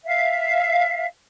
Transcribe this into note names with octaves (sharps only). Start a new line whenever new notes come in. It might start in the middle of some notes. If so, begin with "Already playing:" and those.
E5 F5